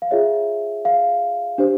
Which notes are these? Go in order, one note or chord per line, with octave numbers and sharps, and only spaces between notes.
F5
F4 G#4 C#5 E5
F5
D4 G4 C5